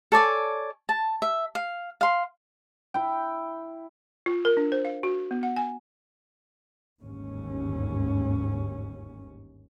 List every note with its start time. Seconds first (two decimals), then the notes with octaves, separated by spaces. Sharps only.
0.12 A4 C#5 D5 G#5
0.89 A5
1.22 E5
1.55 F5
2.01 F5 C6
2.94 E4 G5
4.26 F4
4.45 A#4
4.57 D4
4.72 C5
4.85 F5
5.03 F#4
5.31 B3
5.43 F#5
5.56 G#5
7.02 G1 D#2 G#2 C#4